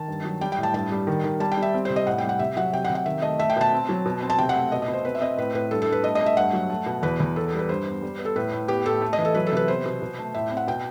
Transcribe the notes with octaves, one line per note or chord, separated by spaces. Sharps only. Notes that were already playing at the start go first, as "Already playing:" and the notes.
Already playing: D#3 A5
G2
F#3
G3 G5
G5
A2
A5
G2 A5
G3
D#3
D#3
G3 A5
G5
G3
E5
C4
C3 C5
D#5
A2 F#5
G3 G5
F#5
C3 E5
F#3 F#5
C3 G5
F#5
C3
F#5
D#3 E5
A3 D#5
A3 E5
G5
B2 A5
C4
F#3
B2
C4
A5
C3 G5
F#5
A3
B2 D#5
D#5
B2
C5
C4 B4
E5
C4 D#5
A2 B4
A2 B4
G2 A4
A4
G2 B4
A3 D#5
A3 D#5
E5
G2 F#5
F#3
A3
B2
E2 B4
E2
B3 A4
A4
G3
B4
G2 C5
B3
G3
B3
A4
A2 B4
A2
B3 G4
A2 A4
A3
D#5
E3
A4
F#3 B4
A4
C3 B4
B3 C5
B2
B2
A3
A2 E5
C4
F#5
B2 G5